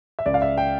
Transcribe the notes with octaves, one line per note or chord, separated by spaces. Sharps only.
E5
C#2 D5
F5
E5
G5